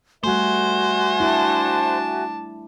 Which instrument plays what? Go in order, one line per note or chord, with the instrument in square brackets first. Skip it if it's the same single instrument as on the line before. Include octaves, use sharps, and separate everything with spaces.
[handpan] G3 A3 [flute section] F#4 E5 G#5 [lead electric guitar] C5
[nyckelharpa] D4 A5 [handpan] E4